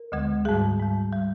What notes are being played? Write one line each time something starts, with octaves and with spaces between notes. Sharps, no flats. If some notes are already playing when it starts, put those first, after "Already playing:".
Already playing: A#4
D2 D3 G#3
G#2 G3 G#4
G#2 G3
G3